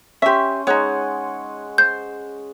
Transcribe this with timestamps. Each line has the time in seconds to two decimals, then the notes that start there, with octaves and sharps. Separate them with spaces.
0.22 C#4 G4 E5 C6
0.67 G#3 D#4 C#5 F#5 G#5
1.78 C5 G6